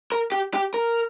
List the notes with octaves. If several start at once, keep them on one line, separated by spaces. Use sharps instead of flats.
A#4
G4
G4
A#4